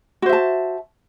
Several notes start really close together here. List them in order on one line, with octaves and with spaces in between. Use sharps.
F#4 C5 E5 A5